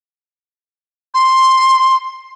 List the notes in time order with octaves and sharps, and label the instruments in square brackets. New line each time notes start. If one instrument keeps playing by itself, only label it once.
[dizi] C6